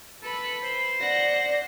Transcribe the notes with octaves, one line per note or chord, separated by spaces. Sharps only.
A4 B4 B5
C5
D5 F#5 A#6